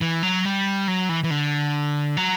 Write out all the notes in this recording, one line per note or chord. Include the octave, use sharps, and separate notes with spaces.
E3
F#3
G3
F#3
E3
E3
D3
F#3